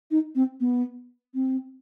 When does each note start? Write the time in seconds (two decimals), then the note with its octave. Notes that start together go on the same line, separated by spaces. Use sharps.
0.11 D#4
0.35 C4
0.60 B3
1.34 C4